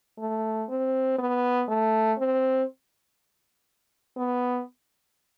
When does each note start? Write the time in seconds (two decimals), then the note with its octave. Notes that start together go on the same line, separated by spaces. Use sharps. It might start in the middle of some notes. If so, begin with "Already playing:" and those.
0.19 A3
0.69 C4
1.19 B3
1.68 A3
2.19 C4
4.17 B3